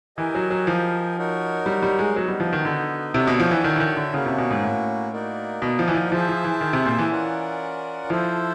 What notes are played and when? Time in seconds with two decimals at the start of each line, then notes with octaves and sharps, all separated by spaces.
0.17 E3 G4 A#4 D#5 G#5
0.35 F#3
0.50 F#3
0.67 F3
1.17 D#4 F#4 A#4 C#5
1.66 G3
1.83 G3
1.99 G#3
2.15 F#3 B3 D#4 F#4
2.28 G3
2.40 F3
2.53 D#3
2.65 D3
3.14 C3 D4 F#4 A4 C#5 E5
3.27 B2
3.40 F3
3.51 E3
3.64 D#3
3.76 E3
3.80 D#3
3.97 D3
4.13 C#3 A#3 C#4 F#4
4.26 C3
4.38 B2
4.50 G#2
4.64 A2
5.12 A#3 D#4 F#4 A#4 D5
5.62 B2
5.79 F3
5.88 E3
5.95 F3
6.12 F3 G#4 C5 E5 A5
6.29 F3
6.44 E3
6.61 D#3
6.73 C3
6.86 A#2
6.99 E3
7.10 C#4 F4 A#4 D5 F#5
8.09 F3 E4 A4 C5